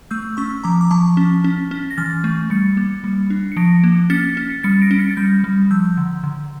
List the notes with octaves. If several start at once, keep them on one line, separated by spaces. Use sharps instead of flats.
A3 E6 G6
C#4 C#6 E6
F3 A#5 D6
D6
F3 A5 C#6
C#4
C#4
C#4
A#6
E3 F6 A6
A3
G3 A6 C#7
A#3
G3
D4
C#7
F3 A#6 D7
A#3
C#4 A6 C#7
C#4
G3 A6 C#7
A#6 D7
C#4
A6 C#7
A6
G3 G6 A#6
G3
F3 E6 G6
D3
D3